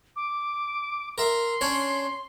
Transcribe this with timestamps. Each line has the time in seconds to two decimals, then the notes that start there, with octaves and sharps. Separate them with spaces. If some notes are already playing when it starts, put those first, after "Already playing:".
0.16 D6
1.18 A#4 E5 C6
1.61 C#4 D4 C#5